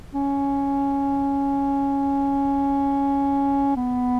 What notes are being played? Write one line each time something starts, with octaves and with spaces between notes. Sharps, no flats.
C#4
B3